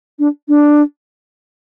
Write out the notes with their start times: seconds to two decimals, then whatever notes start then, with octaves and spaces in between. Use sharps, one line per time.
0.19 D4
0.48 D4